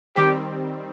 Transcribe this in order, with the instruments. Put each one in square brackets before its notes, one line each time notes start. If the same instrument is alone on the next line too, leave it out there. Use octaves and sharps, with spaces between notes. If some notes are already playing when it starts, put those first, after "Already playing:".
[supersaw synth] D#3 G3 C4 [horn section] G4